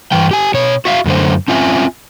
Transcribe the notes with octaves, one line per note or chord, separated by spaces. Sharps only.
G2 E3 G5
G4 G#5
B2 C#5
F#4 E5 F5
F#2 D3 A3 C5
C4 C#4 F4 E5 G#5